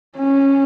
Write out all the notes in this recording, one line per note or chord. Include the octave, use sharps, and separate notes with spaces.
C#4